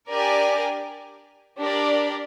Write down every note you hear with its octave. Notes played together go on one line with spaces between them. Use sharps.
D4 G4 A#4 D5 G#5
D4 G4 A#4 D5